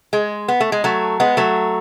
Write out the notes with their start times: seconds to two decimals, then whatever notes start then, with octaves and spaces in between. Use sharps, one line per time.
0.13 G#3
0.48 B3
0.60 A3
0.72 G#3
0.84 F#3 A3
1.20 G#3 B3
1.37 F#3 A3